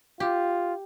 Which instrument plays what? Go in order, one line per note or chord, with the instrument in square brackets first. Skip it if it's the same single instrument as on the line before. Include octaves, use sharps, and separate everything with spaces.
[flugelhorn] F4 [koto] G4